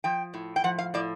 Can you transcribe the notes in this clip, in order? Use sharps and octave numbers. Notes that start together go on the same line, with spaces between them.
F3 G5
A2
G5
F3 F#5
F5
A2 D5